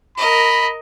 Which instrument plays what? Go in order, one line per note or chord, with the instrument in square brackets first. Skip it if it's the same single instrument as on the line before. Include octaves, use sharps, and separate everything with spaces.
[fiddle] A#4 D#5 [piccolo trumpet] B5